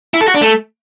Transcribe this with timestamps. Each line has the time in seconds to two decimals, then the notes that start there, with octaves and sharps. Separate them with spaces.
0.14 E4
0.21 A4
0.28 F#4
0.35 D4
0.42 A3